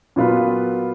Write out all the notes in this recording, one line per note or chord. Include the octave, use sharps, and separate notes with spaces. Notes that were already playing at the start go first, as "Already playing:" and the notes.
A#2 F#3 B3 F4 B4